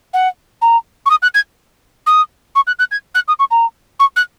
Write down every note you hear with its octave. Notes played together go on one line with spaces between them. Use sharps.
F#5
A#5
C#6
D#6
F#6
G#6
D#6
C#6
F#6
F#6
G#6
F#6
D#6
C#6
A#5
C#6
F#6